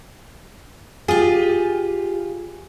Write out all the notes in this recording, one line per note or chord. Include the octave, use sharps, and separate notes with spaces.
F4 G4 G#4